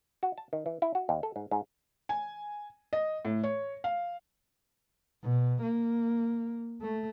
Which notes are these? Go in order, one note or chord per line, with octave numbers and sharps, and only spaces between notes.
F#4
A5
D#3
E3
E4
F#4
D#2
A4
G#2
G#2
G#5
D#5
A2
C#5
F5
B2
A#3
A3